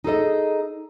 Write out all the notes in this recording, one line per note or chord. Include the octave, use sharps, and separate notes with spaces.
D#4 G#4 A4 D#5